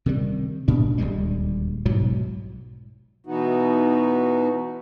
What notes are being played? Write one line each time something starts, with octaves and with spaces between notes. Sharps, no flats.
C3 D#3 G3
A#2 D4
D#1 D2 G3 G#3
B1 G#2 B2 F#3
B2 E3 B3 D#4 F#4